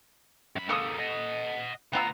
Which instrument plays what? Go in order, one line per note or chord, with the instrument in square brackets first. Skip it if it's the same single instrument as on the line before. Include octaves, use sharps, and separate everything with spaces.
[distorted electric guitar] F#2 B5
[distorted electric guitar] G#3 A#3 [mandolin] A4 D#6 E6
[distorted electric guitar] D#5 F#5
[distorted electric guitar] D2 A#5 [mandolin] B3 F4 E6